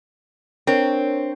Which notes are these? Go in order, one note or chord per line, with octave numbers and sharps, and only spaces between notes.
C4 D4 A#4 C#5